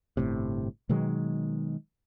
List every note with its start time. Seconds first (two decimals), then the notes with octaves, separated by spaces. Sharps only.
0.17 G1 A2 C3
0.89 B2 D#3 F#3 G#3